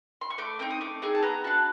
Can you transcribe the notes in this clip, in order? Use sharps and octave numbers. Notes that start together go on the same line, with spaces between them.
C6
C#6
A3 D6
C4 D#4 D6
D#6
A3 D6
C4 D#4 G#4
A5
B3 A#5
D4 F#4 A5